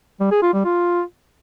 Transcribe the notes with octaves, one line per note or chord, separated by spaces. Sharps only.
G3
G#4
F4
G3
F4